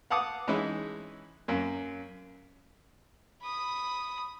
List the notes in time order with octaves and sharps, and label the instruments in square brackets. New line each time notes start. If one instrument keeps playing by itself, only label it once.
[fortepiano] F5 F#5 A5 D6 D#6
E3 G#3 C#4 D#4 E4
F#2 A#3
[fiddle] B5 D#6